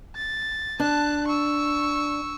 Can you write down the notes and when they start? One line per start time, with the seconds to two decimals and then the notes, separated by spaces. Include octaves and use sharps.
0.16 A6
0.80 D4 A5 F#6
1.28 C#6 E6